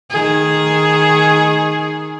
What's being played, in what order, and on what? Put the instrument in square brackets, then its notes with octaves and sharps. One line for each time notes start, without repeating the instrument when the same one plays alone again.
[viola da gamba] D#3 G#4